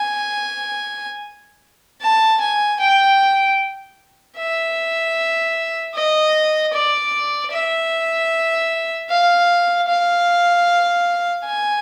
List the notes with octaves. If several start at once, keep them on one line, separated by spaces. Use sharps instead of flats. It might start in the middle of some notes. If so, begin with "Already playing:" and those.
Already playing: G#5
A5
G#5
G5
E5
D#5
D5
E5
F5
F5
G#5